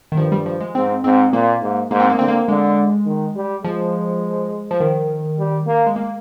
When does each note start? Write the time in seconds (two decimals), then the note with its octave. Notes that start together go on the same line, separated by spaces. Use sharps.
0.12 D#3
0.17 G2 F3
0.32 G3
0.46 F3
0.60 G#3
0.75 G#2 C4
1.04 G#2 C4
1.32 A#2 A#3
1.62 G#2
1.91 G#2 A#3
2.00 C4
2.10 A#3
2.19 D3 C4
2.28 A#3
2.48 D3 G#3
3.06 D#3
3.36 G3
3.64 F3 G#3
4.71 F3
4.80 D#3
5.38 G3
5.67 A#3
5.87 G#3
5.96 A#3